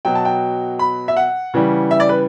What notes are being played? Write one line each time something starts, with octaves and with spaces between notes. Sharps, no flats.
B2 F#3 G5
A5
G5
B5
E5
F#5
C#3 E3 G3
E5
D5
B4